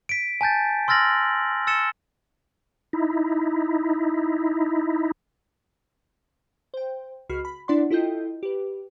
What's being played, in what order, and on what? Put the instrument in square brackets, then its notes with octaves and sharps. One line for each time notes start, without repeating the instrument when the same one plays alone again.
[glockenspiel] B6 D7
G#5 A5 G6 A6
C6 E6 F6 A6 A#6 F#7
E6 A6 C#7 E7 G7
[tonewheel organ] D#4 E4
[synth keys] C5 G5
C#2 F#4 B5 F6 C7
B5
D4 E4 D5 F#5 C6
E4 F4 A4 D#5 G5 G6
G4 B4